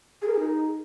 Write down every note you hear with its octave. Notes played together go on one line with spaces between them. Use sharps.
G#4
A#4
G#4
D#4